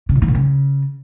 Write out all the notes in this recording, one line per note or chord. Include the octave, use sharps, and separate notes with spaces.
C#3
A#2
D#3
A#2
C#3